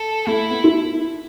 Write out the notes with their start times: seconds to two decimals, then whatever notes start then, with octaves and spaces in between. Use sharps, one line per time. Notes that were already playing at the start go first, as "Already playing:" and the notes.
Already playing: A4
0.27 A3 E4
0.50 B3
0.64 E4